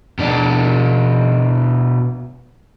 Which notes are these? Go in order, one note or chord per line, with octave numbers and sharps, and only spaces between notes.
B2 D4